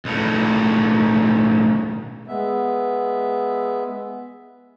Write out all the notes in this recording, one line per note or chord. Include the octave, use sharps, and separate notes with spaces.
B1 A2
G#3 B3 E5